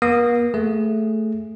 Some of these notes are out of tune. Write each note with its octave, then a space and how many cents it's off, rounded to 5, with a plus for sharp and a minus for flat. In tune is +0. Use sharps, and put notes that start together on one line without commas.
A#3 +40 D#6 -10
A3 +0 G#4 +0